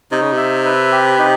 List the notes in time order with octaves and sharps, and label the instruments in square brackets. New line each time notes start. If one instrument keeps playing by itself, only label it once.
[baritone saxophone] C3 [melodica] D#4
[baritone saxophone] C#3
C3
[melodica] E5
B4
G4
D#4